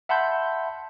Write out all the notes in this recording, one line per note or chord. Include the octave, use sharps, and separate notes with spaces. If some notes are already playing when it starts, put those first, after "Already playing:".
E5 F#5 A5 B5 C6 G6